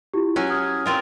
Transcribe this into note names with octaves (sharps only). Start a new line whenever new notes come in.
E4 F4 G4
F#3 C#4
D#6 F6 G#6
C4 F4 A#4